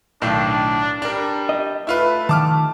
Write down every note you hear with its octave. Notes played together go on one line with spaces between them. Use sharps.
B1 A2 D#3 D4
G3 D4 A#4
D#5
A3 E4 F4 B4
D#3 A5 D6 F6